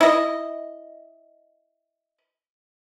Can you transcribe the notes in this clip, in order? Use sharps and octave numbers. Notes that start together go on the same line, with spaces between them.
E4 D#5